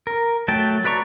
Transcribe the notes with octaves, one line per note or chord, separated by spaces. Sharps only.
A#4
F#3 A3 G5 A5
F#4 B4 D5 A#5 C#6